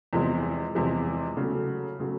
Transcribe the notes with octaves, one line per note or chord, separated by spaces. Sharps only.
E2 C3 F3 G#3
E2 C3 F3 G#3
C#3 F#3 A3
C#3 F#3 A3